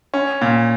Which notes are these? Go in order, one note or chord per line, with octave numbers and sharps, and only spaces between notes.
C#4
A#2